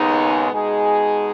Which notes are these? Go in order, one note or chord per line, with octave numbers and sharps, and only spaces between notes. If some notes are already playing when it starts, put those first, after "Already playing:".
Already playing: D#2 C#3 G#3 B3 D#4
B2 G#3 D#4 G#4